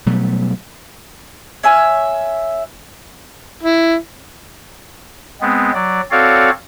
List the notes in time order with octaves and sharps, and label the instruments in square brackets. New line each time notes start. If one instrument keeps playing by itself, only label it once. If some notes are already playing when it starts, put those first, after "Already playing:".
[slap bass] B2 F#3 G3 A3
[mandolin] C#5 E5 G#5 F6
[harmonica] E4
[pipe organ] G#3 B3 C4
F#3 D5
C4 F#4 A4 C#5 D5 F5